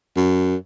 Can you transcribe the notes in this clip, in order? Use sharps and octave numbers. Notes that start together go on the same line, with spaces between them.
F#2